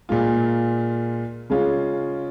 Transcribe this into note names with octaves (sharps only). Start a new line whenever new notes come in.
A#2 G#3 F4
C#3 G#3 C#4 F4